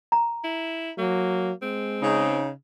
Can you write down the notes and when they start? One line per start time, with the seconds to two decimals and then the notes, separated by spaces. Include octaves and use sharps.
0.12 A#5
0.44 E4
0.98 F#3 A#3
1.62 G#3 C4
2.01 C#3 D#4